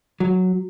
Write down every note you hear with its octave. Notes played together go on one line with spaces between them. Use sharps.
F#3